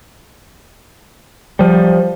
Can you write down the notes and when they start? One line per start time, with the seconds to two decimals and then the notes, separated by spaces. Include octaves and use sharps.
1.59 F3 G3